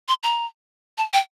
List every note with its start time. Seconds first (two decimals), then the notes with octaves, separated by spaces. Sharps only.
0.08 C6
0.23 A#5
0.98 A5
1.13 G5